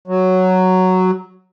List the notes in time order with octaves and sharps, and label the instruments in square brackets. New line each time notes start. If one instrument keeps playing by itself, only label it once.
[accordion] F#3